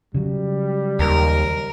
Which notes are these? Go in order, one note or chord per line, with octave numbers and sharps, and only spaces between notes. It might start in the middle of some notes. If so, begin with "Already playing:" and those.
C#3 F#3 G3
D#2 A#4